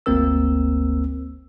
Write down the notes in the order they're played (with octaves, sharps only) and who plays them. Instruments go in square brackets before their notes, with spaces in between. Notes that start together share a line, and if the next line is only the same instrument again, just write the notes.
[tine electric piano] G1 D2 A#3 C4 A#4 E6